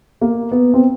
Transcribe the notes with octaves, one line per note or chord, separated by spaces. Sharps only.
A#3
B3
C4